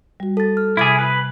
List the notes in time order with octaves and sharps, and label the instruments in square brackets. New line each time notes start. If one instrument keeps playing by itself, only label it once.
[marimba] G3 F#4
[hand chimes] A4 A6
F6
[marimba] C3 D6 G#6 [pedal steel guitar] E4 G#4
[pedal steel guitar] B4